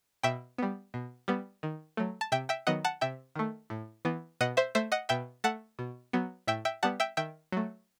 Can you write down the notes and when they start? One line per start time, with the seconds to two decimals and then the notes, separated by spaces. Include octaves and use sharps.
0.23 B2 E5 G5
0.58 G3 B3
0.94 B2
1.28 G3 B3
1.63 D#3
1.97 F#3 A3
2.21 A5
2.32 C3 E5 G5
2.49 E5 G5
2.67 D#3 F#3 B3 D#5 F#5
2.85 F#5 A5
3.01 C3 E5 G5
3.35 D#3 A3
3.70 A2
4.05 E3 B3
4.41 B2 D#5 F#5
4.57 C5 E5
4.75 A3 C5 E5
4.92 D#5 F#5
5.09 B2 E5 G5
5.44 A3 F#5 A5
5.79 B2
6.13 F#3 B3
6.47 A2 E5 G5
6.65 E5 G5
6.83 G3 B3 F#5 A5
7.00 E5 G5
7.17 D#3 E5 G5
7.52 F#3 A3